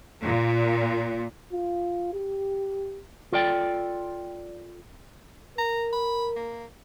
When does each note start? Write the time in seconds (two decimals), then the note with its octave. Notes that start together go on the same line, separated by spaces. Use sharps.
0.23 A#2
1.52 F4
2.13 G4
3.32 F4 A4 D5 G5
5.58 A#4 A#5
5.93 B5
6.36 A#3